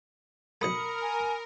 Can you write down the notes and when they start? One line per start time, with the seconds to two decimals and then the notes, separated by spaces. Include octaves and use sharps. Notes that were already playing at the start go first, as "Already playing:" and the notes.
0.61 B1 A3 A#4 B5 D#6 C#7
1.02 G#5